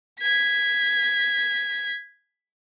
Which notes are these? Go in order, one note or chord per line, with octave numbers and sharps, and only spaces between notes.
G#6 B6